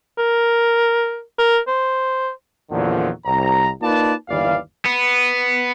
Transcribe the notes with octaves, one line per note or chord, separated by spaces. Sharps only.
A#4
A#4
C5
E2 A#2 D3 D#3 F3 F#3
C2 A#5
A#3 D#4 F4 B4 D5 A5
G1 D#2 E3 D5 F5
B3